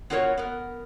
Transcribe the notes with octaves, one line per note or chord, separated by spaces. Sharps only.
B3 F4 F#4 A#4 C5 C#5
B3 A#4